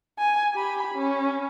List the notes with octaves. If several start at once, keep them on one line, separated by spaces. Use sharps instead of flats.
G#5
G4 B5
C#4